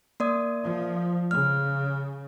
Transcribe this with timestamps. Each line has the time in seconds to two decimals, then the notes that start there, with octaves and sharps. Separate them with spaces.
0.20 A#3 D5 D#6
0.64 F3
1.31 C#3 F6